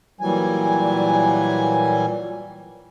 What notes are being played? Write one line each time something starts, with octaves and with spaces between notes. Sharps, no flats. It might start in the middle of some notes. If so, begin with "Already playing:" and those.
A#2 E3 F#3 G3 G#5